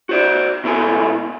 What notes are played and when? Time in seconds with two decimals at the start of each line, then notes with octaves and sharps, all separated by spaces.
0.09 F#4 C5 D5
0.64 B2 B3 E4 A4 G#5